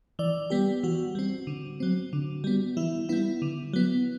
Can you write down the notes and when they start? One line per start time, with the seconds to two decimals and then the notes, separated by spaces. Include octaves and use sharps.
0.19 E3 D5
0.50 G3 B3 G4
0.83 E3 F#4
1.15 G3 C4
1.47 D3
1.80 F#3 C4
2.13 D3
2.44 G3 B3
2.77 E3 E4
3.09 G3 B3 E4
3.42 D3
3.73 F#3 B3